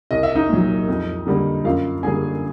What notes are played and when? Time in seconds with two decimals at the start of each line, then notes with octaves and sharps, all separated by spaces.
0.11 C2 D#5
0.23 E5
0.35 D#4 D#5
0.49 A#2 F#3
0.88 F2
1.27 D3 G3 A#3
1.65 F#2 F4 F5
2.03 D3 G3 A#3 G#4 G#5